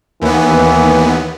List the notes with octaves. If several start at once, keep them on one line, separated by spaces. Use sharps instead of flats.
D#2 E3 B3